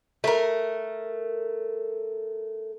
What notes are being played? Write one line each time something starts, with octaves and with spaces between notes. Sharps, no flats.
A3 A#4